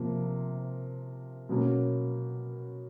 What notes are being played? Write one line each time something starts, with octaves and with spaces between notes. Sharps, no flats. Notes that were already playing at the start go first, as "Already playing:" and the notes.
Already playing: C3 F3 A#3
B2 F#3 A#3 C#4